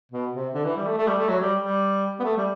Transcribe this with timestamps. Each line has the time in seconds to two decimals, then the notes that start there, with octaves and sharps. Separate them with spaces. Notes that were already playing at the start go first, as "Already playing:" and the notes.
0.12 B2
0.34 C3
0.54 D3
0.65 E3
0.77 G3
0.87 A3
0.98 A3
1.07 G3
1.19 A3
1.29 F#3
1.40 G3
1.61 G3
2.20 B3
2.24 A3
2.37 G3